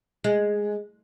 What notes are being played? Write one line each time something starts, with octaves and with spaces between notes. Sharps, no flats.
G#3